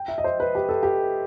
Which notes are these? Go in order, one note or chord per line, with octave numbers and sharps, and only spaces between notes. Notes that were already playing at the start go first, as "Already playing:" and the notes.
Already playing: G5
E5
D#5
C5
B4
G4
A4
G4